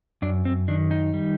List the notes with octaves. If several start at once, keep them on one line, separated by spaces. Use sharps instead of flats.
F#2 D4
C4
D#3 D4
D#4
G3